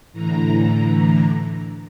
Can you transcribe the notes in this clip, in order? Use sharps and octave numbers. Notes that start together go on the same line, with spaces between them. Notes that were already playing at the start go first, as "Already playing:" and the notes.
A2 D3 E3 A#5